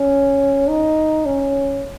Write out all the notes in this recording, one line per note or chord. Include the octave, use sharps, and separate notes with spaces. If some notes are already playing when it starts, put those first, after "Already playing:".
Already playing: C#4
D#4
C#4